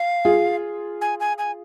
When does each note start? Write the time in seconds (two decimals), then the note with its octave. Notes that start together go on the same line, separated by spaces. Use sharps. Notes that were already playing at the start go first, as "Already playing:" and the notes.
Already playing: F5
0.25 F4 G#4
1.01 G#5
1.20 G#5
1.38 G#5